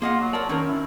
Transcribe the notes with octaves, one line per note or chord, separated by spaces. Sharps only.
A#3 F4 G#4 D#5 F#5
F#3
A#4 C#5 D5 A5
D#3 C#4 D#4 A#4
E4